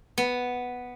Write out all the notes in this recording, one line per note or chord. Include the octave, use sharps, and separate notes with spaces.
B3